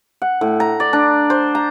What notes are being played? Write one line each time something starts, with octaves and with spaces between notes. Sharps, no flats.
F#5
A2
A#5
D5
D4
C5
A#5